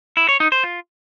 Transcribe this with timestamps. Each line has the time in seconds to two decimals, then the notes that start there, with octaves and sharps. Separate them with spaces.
0.17 E4
0.29 C#5
0.40 D#4
0.52 C5
0.64 F4